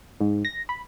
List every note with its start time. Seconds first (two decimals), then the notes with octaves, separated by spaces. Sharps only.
0.20 G#2
0.45 A#6
0.69 B5